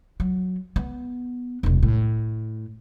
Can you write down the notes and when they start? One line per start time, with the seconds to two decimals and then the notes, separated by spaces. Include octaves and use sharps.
0.20 F#3
0.76 B3
1.63 E1 C2
1.83 A2